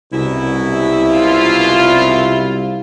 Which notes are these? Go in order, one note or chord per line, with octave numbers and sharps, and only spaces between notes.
C2 F#2 B2 E4
F4